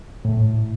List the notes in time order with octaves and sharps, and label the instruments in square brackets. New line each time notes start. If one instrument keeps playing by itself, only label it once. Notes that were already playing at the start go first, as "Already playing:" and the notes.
[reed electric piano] A2